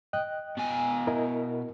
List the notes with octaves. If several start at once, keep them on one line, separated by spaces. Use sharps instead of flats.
D#5 G5 F#6
B2 G#5
E4 A#4 D#5